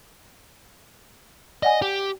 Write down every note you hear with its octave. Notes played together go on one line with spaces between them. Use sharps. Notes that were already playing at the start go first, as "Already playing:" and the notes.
D5 D#5 F#5 G#5
G4